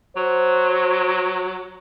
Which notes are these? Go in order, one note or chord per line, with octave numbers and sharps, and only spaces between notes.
F#3 C5